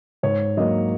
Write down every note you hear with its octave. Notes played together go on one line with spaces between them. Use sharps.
G#2 C#5
F#3 A#3 D#5